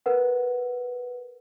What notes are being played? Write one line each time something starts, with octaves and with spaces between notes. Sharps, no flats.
A#4 B4 F#5